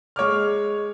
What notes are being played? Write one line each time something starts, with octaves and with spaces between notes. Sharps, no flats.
G#3 C#5 D6 F6